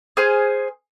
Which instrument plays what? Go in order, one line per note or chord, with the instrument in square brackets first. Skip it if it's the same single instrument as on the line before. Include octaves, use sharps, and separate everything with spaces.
[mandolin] G#4 C5 G#5 F6